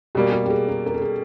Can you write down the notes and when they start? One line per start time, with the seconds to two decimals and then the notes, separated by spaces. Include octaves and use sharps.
0.15 B2 G3 A#3 G4
0.32 G4
0.46 G4
0.50 G#4
0.68 A#4
0.86 A#4
0.94 A4
1.02 G#4